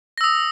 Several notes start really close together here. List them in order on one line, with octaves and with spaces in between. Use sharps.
A#6 E6 D#6